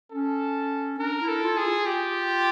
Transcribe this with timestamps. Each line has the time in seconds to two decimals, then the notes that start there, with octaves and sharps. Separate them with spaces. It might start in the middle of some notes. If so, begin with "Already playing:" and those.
0.11 C#4 A4
0.99 D4 A#4
1.21 E4
1.28 A4
1.43 F4
1.57 G#4
1.65 F4
1.86 G4